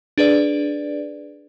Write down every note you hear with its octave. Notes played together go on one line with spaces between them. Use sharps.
D4 G#4 B4 D5